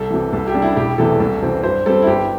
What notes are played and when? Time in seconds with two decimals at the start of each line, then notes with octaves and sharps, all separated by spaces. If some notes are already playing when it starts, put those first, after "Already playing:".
Already playing: C2 A4
0.11 C3 E3
0.33 C2 A4
0.48 G4
0.55 C3 G3 D4
0.62 E4
0.76 E1 G4
0.98 E2 C3 E3 A3 A4
1.20 C2 A4
1.42 C3 E3 C4
1.63 G2 C5
1.86 G3 C4 A4
2.02 E4
2.07 G1 G4